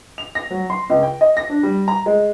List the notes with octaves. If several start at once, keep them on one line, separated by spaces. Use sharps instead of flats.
F7
A#6
F#3
C6
C#2
G5
D#5
A#6
D4
G3
A#5
G#3